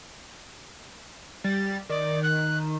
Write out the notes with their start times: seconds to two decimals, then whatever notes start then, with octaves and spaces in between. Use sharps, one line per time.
1.44 G3 A6
1.89 D#3 D5
2.23 F#6